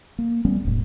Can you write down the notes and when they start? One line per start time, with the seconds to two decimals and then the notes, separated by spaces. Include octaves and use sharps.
0.19 A#3
0.45 G3 A3 B3 C#4
0.65 E1 A2